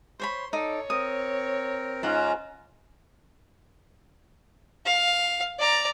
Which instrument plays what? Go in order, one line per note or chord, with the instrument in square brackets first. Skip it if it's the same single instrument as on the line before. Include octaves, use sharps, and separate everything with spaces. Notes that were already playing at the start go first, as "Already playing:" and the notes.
[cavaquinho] C5 C#5 B5 [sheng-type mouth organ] C6
[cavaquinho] D#4 D5 [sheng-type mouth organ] A4 [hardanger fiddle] C#5
[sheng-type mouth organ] C4 A#4 [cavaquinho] D#6
[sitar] G#2 [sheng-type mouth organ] C#4 F4 A#5 [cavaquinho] C5 F#5
[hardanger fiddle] F5
D5 A#5